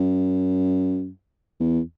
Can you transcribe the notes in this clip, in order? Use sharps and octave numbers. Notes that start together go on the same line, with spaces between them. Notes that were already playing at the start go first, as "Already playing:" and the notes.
Already playing: F#2
E2